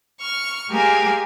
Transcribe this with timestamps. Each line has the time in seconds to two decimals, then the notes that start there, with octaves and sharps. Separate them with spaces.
0.20 C#6 F6
0.70 G#3 A#3 G4 G#4 A#4 G#5